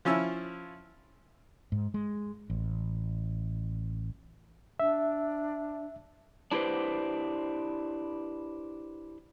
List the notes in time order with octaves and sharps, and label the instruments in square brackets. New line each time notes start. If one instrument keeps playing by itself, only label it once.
[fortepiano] F3 C#4 E4 E6
[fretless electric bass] G#2
G#3
A1
[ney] D4 [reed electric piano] E5
[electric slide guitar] D4 E4 G4 B4 C5